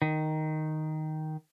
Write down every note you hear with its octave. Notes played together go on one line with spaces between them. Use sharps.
D#3